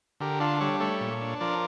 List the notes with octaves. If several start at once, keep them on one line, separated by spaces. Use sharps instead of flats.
D3 G4 A#4
D4 F4 A4
G3 A4 C#5
A3 A4 C#5
A#2
D4
F3 A#4 D5